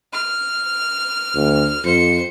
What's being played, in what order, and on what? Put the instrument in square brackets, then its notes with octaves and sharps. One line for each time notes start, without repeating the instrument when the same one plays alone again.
[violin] F6
[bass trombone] D2
[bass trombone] F2 [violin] C5 C#7